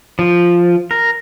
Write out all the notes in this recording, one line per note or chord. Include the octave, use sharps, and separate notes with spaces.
F3
A#4